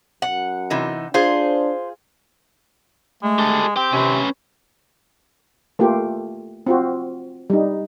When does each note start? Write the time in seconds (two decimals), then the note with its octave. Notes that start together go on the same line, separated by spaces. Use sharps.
0.22 F#2 F#5
0.70 C3 E3 D#4
1.14 D4 F4 G#4 C5
3.23 G#3 A3
3.39 G4 A4
3.76 C4 G4 G5
3.93 C3 C#4 B4
5.79 A3 A#3 F4 G4
6.66 C4 F4 F#4
7.50 G3 D#4